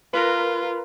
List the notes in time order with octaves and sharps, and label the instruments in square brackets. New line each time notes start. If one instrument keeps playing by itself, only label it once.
[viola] F4 [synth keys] A#4 B4